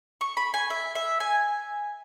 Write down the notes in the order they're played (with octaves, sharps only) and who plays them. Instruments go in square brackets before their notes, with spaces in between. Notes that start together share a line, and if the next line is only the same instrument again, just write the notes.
[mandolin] C#6
B5
G#5
E5
E5
G#5